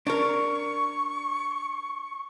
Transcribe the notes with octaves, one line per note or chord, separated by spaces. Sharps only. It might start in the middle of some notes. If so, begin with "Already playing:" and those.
D4 A#4 C#6